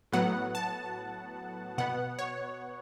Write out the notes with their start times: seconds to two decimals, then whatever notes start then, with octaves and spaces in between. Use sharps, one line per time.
0.12 A2 F#3 B3 F#5
0.55 A5
1.78 B2 B3 F#5
2.19 C#5